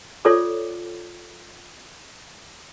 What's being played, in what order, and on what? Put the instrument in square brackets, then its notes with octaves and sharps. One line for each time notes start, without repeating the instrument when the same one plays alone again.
[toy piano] F4 A4 C#5 D5 D6